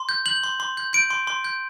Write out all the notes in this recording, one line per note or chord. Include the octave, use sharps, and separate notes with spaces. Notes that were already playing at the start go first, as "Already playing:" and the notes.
Already playing: C6
G6
G6 F#7
C6
C6
G6
G6 D7
C6
C6
G6